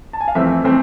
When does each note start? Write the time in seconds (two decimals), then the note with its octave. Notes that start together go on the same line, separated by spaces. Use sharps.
0.13 A5
0.20 G#5
0.28 F5
0.35 F2 E3 A3 C4 E5
0.64 E3 A3 C4